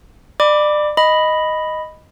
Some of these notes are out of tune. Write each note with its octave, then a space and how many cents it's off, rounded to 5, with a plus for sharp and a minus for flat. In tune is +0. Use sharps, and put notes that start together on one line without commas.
D5 +30 B5 +0 D6 +0
D#5 +0 B5 +0